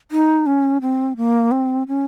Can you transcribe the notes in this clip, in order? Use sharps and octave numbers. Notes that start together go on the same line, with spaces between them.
D#4
C#4
C4
A#3
C4
C#4